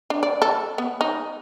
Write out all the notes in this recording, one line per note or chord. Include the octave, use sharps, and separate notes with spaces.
D4
D5
A4
B3
D#4